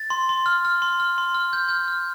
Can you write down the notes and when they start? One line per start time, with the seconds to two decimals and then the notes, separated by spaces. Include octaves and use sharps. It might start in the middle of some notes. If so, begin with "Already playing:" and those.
Already playing: A6
0.10 C6
0.29 C6
0.46 F6
0.65 F6
0.82 C6
1.00 F6
1.18 C6
1.34 F6
1.53 F6 G6
1.69 F6 G6
1.88 F6